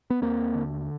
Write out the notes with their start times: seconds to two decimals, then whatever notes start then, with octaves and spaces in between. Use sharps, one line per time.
0.10 B3
0.22 D#2 A#3 C4
0.55 D3